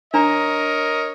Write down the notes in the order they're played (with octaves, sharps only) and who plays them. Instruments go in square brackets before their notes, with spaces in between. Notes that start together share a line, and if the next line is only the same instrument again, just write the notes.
[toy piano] D4 A#5 [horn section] A#4 C#5 D#5